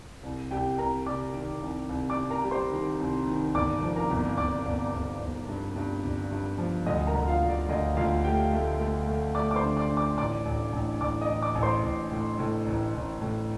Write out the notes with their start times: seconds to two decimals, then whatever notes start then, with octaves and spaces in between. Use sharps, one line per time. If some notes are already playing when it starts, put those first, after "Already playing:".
0.23 C2
0.51 C2 G4 G5
0.78 C2 A#4 A#5
1.06 C3 D5 D6
1.34 D#3
1.62 C2
1.89 C2
2.10 D5 D6
2.17 C3
2.30 A#4 A#5
2.44 G3
2.51 C5 C6
2.72 D#3
3.00 C2
3.28 D#3
3.55 G1 D5 D6
3.82 F3
3.96 A#4 A#5
4.11 G1
4.38 G1 D5 D6
4.66 G1
4.93 G1
5.21 G1
5.48 G2
5.76 G2
6.03 G1
6.31 G2
6.58 F3
6.86 D2 D#5 D#6
7.07 A#4 A#5
7.14 D2
7.28 F4 F5
7.42 D2
7.49 D5
7.69 D2 D#5
7.97 D2 F4 F5
8.24 A3 G4 G5
8.52 A3
8.80 A3
9.07 A3
9.35 A3 D5 D6
9.51 D6
9.56 C5 C6
9.63 D3
9.77 D5 D6
9.90 D3
9.97 D5 D6
10.18 A1 D5 D6
10.46 A1
10.73 A1
11.01 A1 D5 D6
11.21 D#5 D#6
11.28 A1
11.42 D5 D6
11.55 A1
11.63 C5 C6
11.83 A1
12.11 A2
12.39 A2
12.67 A1
12.94 A1
13.21 A2